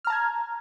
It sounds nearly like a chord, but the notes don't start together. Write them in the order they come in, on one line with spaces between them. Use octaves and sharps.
F6 A#5 A5 G#6